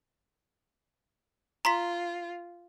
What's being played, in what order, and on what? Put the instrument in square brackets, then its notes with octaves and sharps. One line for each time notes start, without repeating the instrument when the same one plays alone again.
[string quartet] F4 [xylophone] A#5 C6 B6